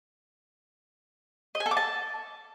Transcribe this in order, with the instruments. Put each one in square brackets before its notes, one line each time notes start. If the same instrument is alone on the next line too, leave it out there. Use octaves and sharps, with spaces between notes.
[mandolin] D#5
G#5
A4
D6
A5